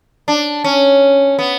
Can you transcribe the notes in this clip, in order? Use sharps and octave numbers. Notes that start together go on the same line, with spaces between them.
D4
C#4
B3